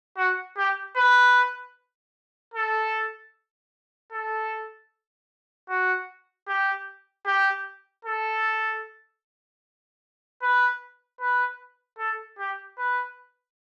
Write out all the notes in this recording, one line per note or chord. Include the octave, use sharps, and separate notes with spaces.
F#4
G4
B4
A4
A4
F#4
G4
G4
A4
B4
B4
A4
G4
B4